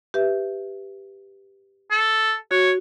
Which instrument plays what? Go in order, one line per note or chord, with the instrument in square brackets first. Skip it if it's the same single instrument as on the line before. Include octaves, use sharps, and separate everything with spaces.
[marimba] G4 B4 E5
[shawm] A4
[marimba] F#4 [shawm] C#5